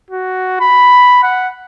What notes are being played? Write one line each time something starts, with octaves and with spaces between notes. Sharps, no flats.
F#4
B5
F#5